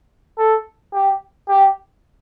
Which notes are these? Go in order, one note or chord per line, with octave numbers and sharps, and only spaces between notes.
A4
G4
G4